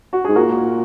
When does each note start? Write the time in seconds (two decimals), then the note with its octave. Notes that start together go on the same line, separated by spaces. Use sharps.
0.13 F#4
0.24 G#2 G#4
0.35 A#2 F#4 A#4